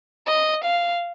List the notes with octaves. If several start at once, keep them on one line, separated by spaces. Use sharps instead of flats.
D#5
F5